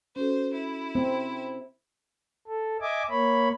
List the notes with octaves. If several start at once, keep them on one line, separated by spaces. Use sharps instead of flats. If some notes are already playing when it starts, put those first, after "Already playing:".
C#4 F#4 A4 C5
E4
C4
A4
D#5 E5 G#5 D6
A#3 C#5 B5